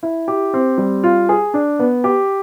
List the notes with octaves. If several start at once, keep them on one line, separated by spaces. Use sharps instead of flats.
E4
G4
C4
G3
F4
G#4
D4
B3
G4